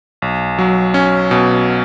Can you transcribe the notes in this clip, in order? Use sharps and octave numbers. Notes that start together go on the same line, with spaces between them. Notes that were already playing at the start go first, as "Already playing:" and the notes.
B1
F#3
C#4
B2